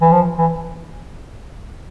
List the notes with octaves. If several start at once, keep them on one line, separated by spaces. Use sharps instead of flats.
E3
F3
E3